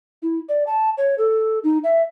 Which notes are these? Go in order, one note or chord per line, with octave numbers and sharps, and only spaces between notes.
E4
D5
A5
C#5
A4
D#4
E5